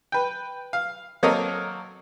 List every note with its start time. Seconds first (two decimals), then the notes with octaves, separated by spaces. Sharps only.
0.12 B4 G5
0.73 F5
1.23 F#3 A#3 C4 A4 A#4 D#5